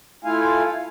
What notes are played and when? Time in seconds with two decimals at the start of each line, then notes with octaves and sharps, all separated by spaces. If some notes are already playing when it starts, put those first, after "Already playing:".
0.24 A3 E4 F4 F5 G#5